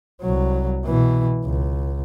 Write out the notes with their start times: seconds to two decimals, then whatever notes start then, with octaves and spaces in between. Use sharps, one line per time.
0.22 C2 F#3
0.85 B2 E3
1.45 C#2